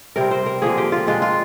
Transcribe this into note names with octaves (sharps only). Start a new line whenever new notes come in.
C3 G3 C4 A#4
C5
A#4
D3 F3 A#3 G#4
G4
F4
A#2 G#3 D4 F4
F4